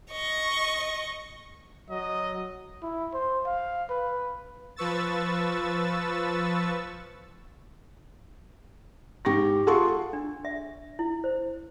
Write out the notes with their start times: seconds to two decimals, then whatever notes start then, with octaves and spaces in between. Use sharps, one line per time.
0.12 D#5 C#6
1.90 F#3 D#5
2.83 E4
3.14 C5
3.46 F5
3.90 B4
4.76 F3 B4 C#6 E6 A6
9.25 G#2 G4 C#6 A#6
9.67 F4 G#4 A4 F#5 C6 C#6
10.13 D4
10.45 E5
10.99 E4
11.24 C5